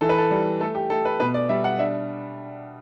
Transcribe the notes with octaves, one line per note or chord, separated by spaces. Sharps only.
E3 A4
B4
A4
G3
A3 A4
G4
A3 A4
B4
B2 B4
D5
G3 E5
F#5
D4 E5